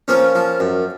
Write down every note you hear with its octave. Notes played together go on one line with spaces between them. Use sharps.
F3 A#3 C#4
F3
F#2